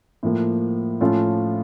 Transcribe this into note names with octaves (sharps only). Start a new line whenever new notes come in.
A2 F3 A#3
A2 F3 A3 C#4 F4